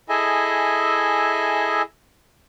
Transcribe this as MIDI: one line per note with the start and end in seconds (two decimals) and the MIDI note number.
0.09 1.82 64
0.09 1.82 68
0.09 1.82 69
0.09 1.82 75
0.09 1.82 76
0.09 1.82 80